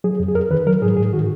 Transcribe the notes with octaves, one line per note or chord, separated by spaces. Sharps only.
F#3 G#4
F2
G#4
F2 A#4
D#3 B4
F#3 A#4
G#2 G#4
G#2 G#4
D#3 F#4